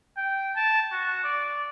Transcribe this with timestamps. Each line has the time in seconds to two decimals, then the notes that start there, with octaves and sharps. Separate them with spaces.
0.17 G5
0.56 A5
0.92 F#4
1.24 D5